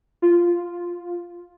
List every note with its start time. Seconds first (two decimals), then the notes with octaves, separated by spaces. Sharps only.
0.22 F4